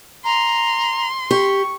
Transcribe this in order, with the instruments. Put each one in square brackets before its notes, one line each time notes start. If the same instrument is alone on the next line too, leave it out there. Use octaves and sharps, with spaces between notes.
[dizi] A#5 [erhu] C6
[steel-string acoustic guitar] G4 [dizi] C#6